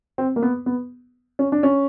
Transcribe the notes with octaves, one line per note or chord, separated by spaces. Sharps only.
C4
A#3
B3
B3
C#4
D4
C#4